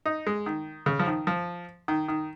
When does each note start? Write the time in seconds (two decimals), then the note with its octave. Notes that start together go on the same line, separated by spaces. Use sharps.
0.05 D#4
0.27 G#3
0.46 D#3
0.86 C#3
0.99 F3
1.07 D#3
1.27 F3
1.88 D#3
2.08 D#3